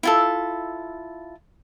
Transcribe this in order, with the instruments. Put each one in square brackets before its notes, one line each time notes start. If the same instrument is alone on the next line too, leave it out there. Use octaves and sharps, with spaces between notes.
[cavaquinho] E4 F4 A4